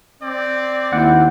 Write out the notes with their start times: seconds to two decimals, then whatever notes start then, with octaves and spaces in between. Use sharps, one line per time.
0.23 C4 D5
0.93 D#2 E4 F#5